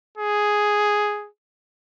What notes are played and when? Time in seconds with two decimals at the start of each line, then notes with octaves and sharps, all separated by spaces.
0.17 G#4